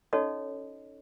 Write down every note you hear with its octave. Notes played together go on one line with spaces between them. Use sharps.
C#4 D#4 F#4 A4 C#5 D#5